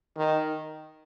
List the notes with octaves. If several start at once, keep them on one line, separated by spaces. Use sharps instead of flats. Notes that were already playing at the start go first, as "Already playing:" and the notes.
D#3